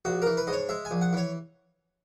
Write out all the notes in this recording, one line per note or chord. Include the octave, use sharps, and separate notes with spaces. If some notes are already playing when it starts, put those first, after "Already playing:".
A#1 F#4
E3 A#4
B4
G#2 D#5
C#5
G#3 E5
G#5
A#1
F#5
E3 C#5